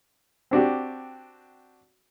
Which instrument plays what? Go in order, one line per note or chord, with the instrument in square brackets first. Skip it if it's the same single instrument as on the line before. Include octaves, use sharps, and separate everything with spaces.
[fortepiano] C4 D4 F#4 G4